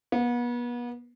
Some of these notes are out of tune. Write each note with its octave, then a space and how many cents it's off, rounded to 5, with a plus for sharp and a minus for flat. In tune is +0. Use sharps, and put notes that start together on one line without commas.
B3 -35